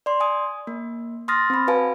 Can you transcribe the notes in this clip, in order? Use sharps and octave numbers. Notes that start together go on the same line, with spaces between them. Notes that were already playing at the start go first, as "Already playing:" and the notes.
D5 C6
G#5 D#6
A#3
C6 D#6 F6 A6 A#6
C4 B5
F#4 B4 F5 G#5 A5